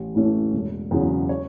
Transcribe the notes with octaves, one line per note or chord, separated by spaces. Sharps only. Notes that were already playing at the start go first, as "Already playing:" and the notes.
Already playing: A1
A2 E3 A3 C#4
E1
E2 C#3 F#3 C#4
C#5